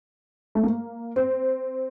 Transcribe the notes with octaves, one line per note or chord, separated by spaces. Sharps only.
A3
A#3
C4